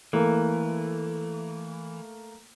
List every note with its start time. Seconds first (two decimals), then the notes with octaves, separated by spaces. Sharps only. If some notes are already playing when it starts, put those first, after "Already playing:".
0.13 E3 A3 A#3